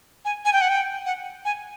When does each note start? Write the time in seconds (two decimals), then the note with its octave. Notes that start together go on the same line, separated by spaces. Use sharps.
0.25 G#5
0.45 G#5
0.53 G5
0.61 F#5
0.69 G5
1.06 F#5
1.45 G#5